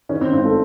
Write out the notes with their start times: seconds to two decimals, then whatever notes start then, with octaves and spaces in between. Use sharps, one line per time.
0.09 D#3 C#4
0.21 C4
0.33 G#1 C4
0.45 A3